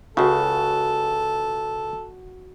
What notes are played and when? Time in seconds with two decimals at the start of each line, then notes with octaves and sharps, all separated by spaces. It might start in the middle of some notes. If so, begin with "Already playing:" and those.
0.17 C#2 C#3 F#4 A4